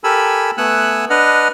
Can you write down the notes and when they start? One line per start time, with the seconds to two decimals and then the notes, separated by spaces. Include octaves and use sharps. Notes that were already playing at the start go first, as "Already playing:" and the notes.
0.04 G4 A4 A#4 G#5 B5 E6
0.58 A3 B3 F#5 G#5 E6 F#6
1.10 D4 B4 D#5 F#5 F6